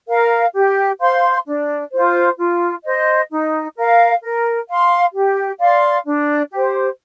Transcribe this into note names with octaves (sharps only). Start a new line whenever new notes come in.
A#4 F5
G4
C5 F5 C6
D4
F4 C5
F4
C5 D#5
D#4
A#4 F5
A#4
F5 C6
G4
D5 F5 C6
D4
G4 C5